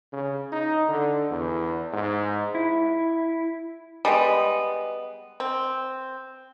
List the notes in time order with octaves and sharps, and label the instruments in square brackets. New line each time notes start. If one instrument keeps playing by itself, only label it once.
[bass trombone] C#3
D#4
D3
E2
G#2
[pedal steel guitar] E4
[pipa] G3 G#3 B3
C4